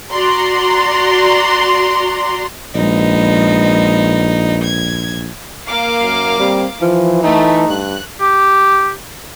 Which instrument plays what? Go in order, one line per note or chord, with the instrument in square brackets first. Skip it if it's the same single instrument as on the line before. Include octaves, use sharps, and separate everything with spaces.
[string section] F#4 D5 A#5 C6
[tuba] A#1 [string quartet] G#3 B3 D#4
[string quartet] G#6
[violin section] A#3 F5 D6
[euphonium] F#2
[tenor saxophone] G3 [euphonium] C4
[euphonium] E3 [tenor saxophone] F3
[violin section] A3 [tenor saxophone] D#4
[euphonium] G2 [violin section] F#6
[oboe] G4